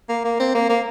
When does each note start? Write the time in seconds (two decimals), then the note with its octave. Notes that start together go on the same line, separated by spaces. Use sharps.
0.09 A#3
0.25 A#3
0.40 C4
0.55 A#3
0.70 A#3